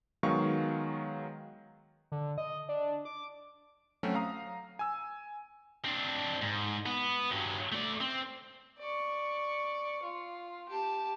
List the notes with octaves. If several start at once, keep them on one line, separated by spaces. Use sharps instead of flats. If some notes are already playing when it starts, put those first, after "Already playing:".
D#3 F#3 G#3 B3 F5 C#6
D3
D#5
D4
D6
F#3 A3 C4 C#4 F#4
F5 A#5 D#6
G#5 E6
C4 D4
G#2
B3
G2 F#3
A3 D5
C4
D5 C#6
F4
G4 A5